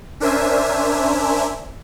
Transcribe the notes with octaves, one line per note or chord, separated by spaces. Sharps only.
C#4 D4 A#4 C5 E5 G#5